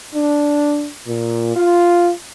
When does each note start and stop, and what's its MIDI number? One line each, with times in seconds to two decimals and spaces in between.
0.13 0.87 62
1.07 1.55 46
1.55 2.11 65